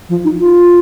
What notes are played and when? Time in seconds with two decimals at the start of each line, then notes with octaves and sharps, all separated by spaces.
0.09 F3
0.24 D#4
0.39 F4